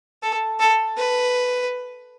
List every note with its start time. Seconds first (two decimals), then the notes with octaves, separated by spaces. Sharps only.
0.23 A4
0.60 A4
0.97 B4